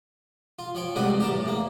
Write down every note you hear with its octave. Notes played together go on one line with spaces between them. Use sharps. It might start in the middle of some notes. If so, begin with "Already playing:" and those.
F4
F3 C#5 G5
A2 C3 G3 G#3 F#4 B4
E2 G4 A#4 A5
A2
E2 A#3